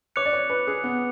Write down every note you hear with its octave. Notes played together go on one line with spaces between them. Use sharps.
C#5 D6 F#6 C#7 F7
D5
C#5
B4
G#4
B3